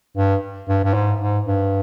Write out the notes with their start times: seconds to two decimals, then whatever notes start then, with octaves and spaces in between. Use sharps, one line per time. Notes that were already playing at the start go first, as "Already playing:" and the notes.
0.17 G2
0.69 G2
0.84 G2
0.94 G#2
1.21 G#2
1.47 G2